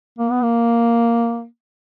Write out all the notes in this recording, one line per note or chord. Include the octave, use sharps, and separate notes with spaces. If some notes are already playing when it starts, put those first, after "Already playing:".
A#3
B3
A#3